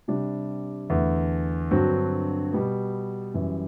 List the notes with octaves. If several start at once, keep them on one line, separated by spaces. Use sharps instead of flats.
C3 G3 D4
E2 D3 A3 E4
G2 D3 F#3 C4 F#4
B2 G3 B3
F#2 E3 G3